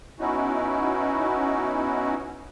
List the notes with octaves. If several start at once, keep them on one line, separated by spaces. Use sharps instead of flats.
B3 C#4 D#4 E4 F#4